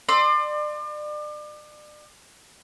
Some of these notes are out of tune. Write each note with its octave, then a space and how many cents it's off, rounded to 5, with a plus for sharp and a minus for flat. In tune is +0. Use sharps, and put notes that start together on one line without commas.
D5 +35 C6 +0 E6 -5